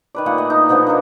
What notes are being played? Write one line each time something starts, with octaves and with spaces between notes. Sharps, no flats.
D#3 B4 D5
A#2 A3 A#3 F#5
D#5
D#4
B2 D3 F3 B3
A#3 D4 A4 A#4